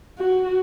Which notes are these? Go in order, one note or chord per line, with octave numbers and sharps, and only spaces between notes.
F#4